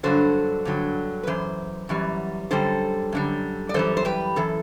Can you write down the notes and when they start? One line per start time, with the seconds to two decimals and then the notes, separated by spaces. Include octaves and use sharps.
0.03 G2 D3 F#3 A4 C5
0.65 G2 D3 F#3
1.23 B4
1.27 F#2 E3 C5
1.89 F#2 E3 G3
2.51 F#2 D3 G3 A4 C5
3.12 F#2 D3 G3
3.69 D5
3.74 F#2 E3 G3 A4 C5
3.97 C5
4.05 G4 B4
4.36 F#2 E3 A4